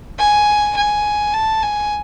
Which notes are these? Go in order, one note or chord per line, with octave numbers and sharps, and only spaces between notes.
G#5
G#5
A5
G#5